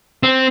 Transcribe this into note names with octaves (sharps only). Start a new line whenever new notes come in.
C4